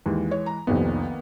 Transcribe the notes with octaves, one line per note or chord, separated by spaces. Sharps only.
D#2 E3 G#3
C#5
A#5
F1 C2 F2 D#3 A#3 B3